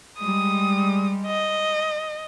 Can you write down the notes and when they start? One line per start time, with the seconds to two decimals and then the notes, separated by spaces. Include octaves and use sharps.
0.18 G3 G#3 D#6
1.26 D#5